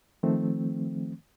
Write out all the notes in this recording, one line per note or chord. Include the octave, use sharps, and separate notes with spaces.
D#3 F3 A3 C4